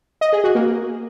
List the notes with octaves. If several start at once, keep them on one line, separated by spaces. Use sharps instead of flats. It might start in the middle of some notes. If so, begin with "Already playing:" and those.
D#5
G#4
F#4
A#3